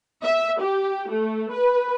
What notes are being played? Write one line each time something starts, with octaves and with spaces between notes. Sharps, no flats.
E5
G4
A3
B4